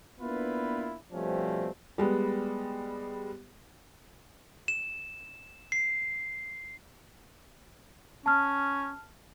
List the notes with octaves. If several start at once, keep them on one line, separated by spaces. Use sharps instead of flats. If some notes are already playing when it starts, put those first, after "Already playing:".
A#3 B3 D4 E4 F4 B4
B2 F3 G3 A3 C4 C#4
G3 G#3 B3
E7
C7
C#4 A5 F6